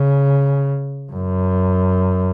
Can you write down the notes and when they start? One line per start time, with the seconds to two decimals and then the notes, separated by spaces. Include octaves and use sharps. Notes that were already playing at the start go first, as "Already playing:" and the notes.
Already playing: C#3
1.12 F#2